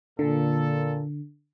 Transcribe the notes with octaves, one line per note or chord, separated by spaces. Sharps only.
A#2 D3 A4